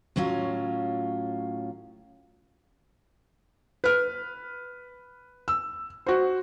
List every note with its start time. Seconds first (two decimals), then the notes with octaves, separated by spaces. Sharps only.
0.16 A2 F#3 C#4 F4
3.84 B4 F6
5.48 E6
6.06 F#4 C5